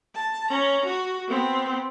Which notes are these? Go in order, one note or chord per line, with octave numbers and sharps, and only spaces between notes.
A5
C#4 A#5
F#4
B3 C4